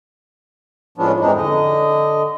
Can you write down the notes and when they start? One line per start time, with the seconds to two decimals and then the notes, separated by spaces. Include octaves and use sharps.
0.98 A2 F3 G#3 B3 C#4 D4
1.20 F2 G#2 E3 G#3 D4 D#4
1.37 D3 D#5